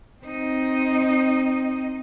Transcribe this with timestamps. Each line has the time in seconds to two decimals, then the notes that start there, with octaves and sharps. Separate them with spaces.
0.24 C4 D#4